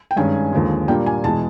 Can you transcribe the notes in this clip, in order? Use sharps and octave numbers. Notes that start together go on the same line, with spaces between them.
G5
G2 D#3 G#3 C#4 G#5
D#2 D3 F3 G#3
A#2 G3 A#3 D4 G5
G#5
E2 B2 G#3 A5